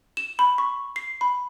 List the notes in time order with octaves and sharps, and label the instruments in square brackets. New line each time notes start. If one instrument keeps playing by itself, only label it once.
[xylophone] E7
B5
C#6
C7
B5